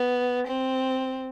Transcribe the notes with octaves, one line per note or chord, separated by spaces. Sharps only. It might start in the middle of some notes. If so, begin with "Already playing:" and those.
Already playing: B3
C4